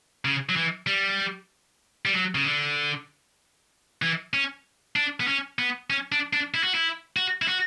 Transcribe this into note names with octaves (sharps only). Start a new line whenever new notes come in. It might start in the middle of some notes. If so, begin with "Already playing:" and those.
C#3
F#3
E3
G3
G3
F#3
C#3
D3
E3
C#4
D4
B3
C#4
B3
C#4
D4
D4
E4
F#4
E4
F#4
E4
F#4